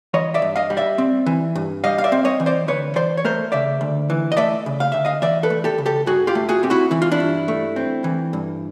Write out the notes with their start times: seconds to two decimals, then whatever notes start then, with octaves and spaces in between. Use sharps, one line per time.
0.14 E3 C#5 D#5
0.34 D5 E5
0.42 G2
0.56 D#5 F5
0.70 G3
0.77 D5 E5
0.98 C4
1.26 E3
1.55 G2
1.84 G3 D#5 F5
1.98 F5
2.04 D5 E5
2.12 C4
2.25 C#5 D#5
2.40 E3
2.46 C5 D5
2.68 D2 B4 C#5
2.95 E3 C5 D5
3.17 C#5
3.24 A3 A#4 C5
3.52 C#3 D5 E5
3.81 D2
4.10 E3
4.32 D#5
4.37 A3 D5 E5
4.66 C#3
4.80 F5
4.92 D2 E5
5.05 D#5 F5
5.22 E3 D5 E5
5.43 A4 B4
5.50 A3
5.64 G4 A4
5.78 C#3
5.86 G4 A4
6.06 G2 F#4 G#4
6.27 F4 G4
6.35 A3
6.49 F#4 G#4
6.63 C4 G4
6.70 E4 F#4
6.91 E3 E4
7.02 F4
7.12 D4 E4
7.20 G2
7.48 A3
7.76 C4
8.04 E3
8.33 G2